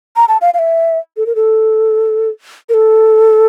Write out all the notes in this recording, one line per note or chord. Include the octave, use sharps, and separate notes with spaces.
A#5
A5
F5
F5
E5
A4
A#4
A4
A#4
A4